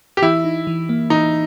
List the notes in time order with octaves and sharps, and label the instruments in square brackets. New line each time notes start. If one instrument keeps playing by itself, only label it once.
[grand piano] G4
[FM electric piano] E3 [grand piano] E4
[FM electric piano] D#4
E3
A#3
[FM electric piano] E3 [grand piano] D#4